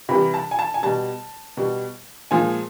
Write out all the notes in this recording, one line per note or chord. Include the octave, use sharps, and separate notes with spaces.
C3 E3 G3 B5
A5
G#5
A5
G#5
B2 G3 A5
B2 G3
A#2 F3 G#3 G#5